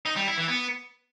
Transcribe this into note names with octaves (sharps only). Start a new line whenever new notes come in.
D#4
G3
E4
E3
B3